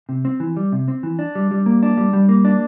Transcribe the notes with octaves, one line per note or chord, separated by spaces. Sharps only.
C3
C4
E3
G3
C3
C4
E3
D4
G3
G3
A#3
D4
G3
G3
A#3
D4